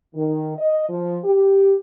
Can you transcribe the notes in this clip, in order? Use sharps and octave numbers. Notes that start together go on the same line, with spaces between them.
D#3
D#5
F3
G4